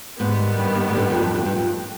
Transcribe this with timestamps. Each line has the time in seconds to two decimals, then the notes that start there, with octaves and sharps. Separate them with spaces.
0.20 G#2 D#3 G3 B3
0.58 G2
0.89 G#2
0.97 G2
1.10 F2
1.23 F2
1.35 F2
1.45 G2
1.55 F2